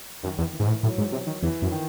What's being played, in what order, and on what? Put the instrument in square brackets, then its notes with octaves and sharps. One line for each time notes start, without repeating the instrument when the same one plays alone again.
[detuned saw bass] F#2 [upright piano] D#3
[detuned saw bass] E2
[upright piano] E3
[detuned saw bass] G#2
A2
[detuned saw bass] A2 [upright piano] F#3
[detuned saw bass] G#2
C3
D#3
[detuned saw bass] E2 [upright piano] E3
[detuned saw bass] F#2
[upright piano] D#3